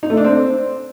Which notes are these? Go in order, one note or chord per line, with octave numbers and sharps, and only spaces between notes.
D#4
A3
D4
C4